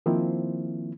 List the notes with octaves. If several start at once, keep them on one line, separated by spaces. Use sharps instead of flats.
D#3 F3 A#3 C4 E4